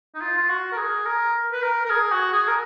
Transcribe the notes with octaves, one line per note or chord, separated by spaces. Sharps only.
D#4
F4
F4
F#4
A#4
G#4
A#4
B4
A#4
A#4
G#4
F#4
G#4
A#4